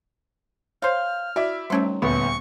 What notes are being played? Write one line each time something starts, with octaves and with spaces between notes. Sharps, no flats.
C5 C#5 F5 F6 G6
E4 F#4 D5 E5
D#3 F#3 G3 A3 C4 C#4
D#1 D2 B3 C#6